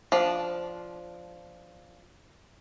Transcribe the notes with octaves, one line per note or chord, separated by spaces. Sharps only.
F3 D4